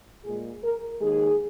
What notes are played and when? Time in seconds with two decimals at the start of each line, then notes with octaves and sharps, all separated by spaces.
0.24 A#2 G#3 G#4
0.62 A#4
1.01 D#2 D#3 G#3 G#4